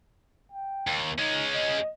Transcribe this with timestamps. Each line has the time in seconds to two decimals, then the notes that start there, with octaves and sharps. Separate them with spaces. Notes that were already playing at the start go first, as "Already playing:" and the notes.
0.52 G5
0.87 D#2
1.18 G#3 C#4 D#4
1.54 D#5